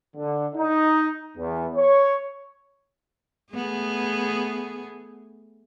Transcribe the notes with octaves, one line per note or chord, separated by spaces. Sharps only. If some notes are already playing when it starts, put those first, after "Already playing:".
D3
D#4
E2
C#5
A3 B3 G#4